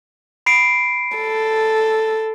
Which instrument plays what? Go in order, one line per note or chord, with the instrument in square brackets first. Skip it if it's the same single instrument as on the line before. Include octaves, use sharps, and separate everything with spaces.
[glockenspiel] B5 C7 D7
[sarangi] A4